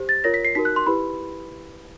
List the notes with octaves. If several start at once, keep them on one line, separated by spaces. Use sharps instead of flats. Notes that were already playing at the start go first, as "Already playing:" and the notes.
Already playing: G4 C5
A6
F4 A#4 C#5 A#6
B6
C7
D#4 F#4 A#4 B6
F#6
C6
E4 G4 B4 B5